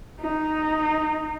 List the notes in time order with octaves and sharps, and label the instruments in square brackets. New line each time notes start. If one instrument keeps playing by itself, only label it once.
[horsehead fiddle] D#4